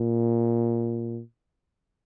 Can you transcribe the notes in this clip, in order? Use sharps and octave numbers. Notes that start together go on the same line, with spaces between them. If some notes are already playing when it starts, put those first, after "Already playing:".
Already playing: A#2